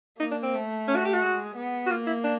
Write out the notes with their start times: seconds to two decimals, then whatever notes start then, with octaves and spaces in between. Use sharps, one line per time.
0.19 A#3 D#4
0.31 D4
0.43 C4
0.54 A3
0.88 C#4
0.96 F#4
1.05 G4
1.13 F#4
1.22 G#3
1.56 B3
1.86 F#4
1.90 A#3 F4
2.07 E4
2.24 D4